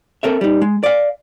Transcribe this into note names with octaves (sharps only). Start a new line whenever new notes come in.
C4 A4 A#4 E5
G3 D#4
G#3
D5 F5